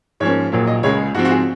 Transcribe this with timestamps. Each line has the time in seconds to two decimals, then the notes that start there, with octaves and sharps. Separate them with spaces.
0.20 G#2 F3 A#3 C#4 C#5
0.52 A#1 A#2 F#3 A#3
0.67 D#5
0.83 C#2 C#3 G#3 C#5
1.15 G#2 F#4
1.17 F3 C4
1.25 F#4
1.31 G#4